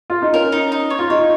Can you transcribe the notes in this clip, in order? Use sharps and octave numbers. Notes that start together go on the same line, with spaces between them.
F4
D#4
C#4 A#4
D#4
D#4
C#5
F4
D#4 C#5